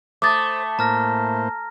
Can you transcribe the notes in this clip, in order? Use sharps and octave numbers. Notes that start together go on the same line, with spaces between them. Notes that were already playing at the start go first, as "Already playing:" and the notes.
A3 C5 D6 D#6 A6
A2 A#3 C5 A#5 F6 A#6